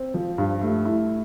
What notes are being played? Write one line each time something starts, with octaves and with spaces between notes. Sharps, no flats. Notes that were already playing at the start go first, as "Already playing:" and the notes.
Already playing: C4
F3
G2
A3
E4